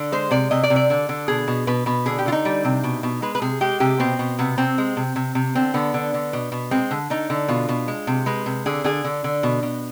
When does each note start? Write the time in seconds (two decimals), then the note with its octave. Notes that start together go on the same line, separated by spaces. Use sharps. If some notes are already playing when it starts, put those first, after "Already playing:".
Already playing: D3
0.12 G#3 C5
0.31 C3 D5
0.51 C3 D#5
0.63 D5
0.70 C3
0.76 D5
0.90 D3
1.09 D3
1.28 B2 G#4
1.48 B2
1.67 B2 B4
1.86 B2 B4
2.06 D3 G#4
2.19 G4
2.26 D3 F4
2.32 D#4
2.45 G3
2.65 C3
2.84 B2
3.03 B2
3.22 G#3 B4
3.35 B4
3.42 C3 G#4
3.61 G#3 G4
3.80 C3 G4
4.00 B2 C4
4.19 B2
4.39 C3 B3
4.58 C3 C4
4.78 G#3
4.97 C3
5.16 C3
5.35 C3
5.55 D3 C4
5.74 D3 B3
5.94 D3
6.14 D3
6.33 B2
6.52 B2
6.71 G#3 C4
6.91 D3
7.10 D3 D#4
7.30 D3
7.48 B2 F4
7.69 B2
7.88 G#3
8.07 C3
8.26 G#3 B4
8.46 C3
8.66 D3 G#4
8.84 D3 G#4
9.04 D3
9.24 D3
9.43 B2
9.63 B2